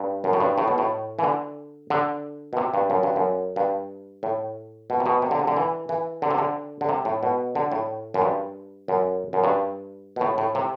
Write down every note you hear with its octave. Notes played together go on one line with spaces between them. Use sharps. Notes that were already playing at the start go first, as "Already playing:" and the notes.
Already playing: G2
F#2
A2
G2
A2
B2
A2
E3
D3
D3
B2
C3
G2
F#2
G2
F#2
G2
A2
B2
C3
B2
C3
D3
C3
D3
E3
E3
D3
C3
D3
D3
C3
A2
B2
D3
A2
F#2
G2
F#2
F#2
G2
B2
A2
A2
C3